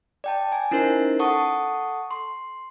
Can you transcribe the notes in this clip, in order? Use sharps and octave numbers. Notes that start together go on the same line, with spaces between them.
D5 G5 A5
G#5
C#4 D#4 E4 A#4 C5
A4 F#5 A5 C#6 D#6
C6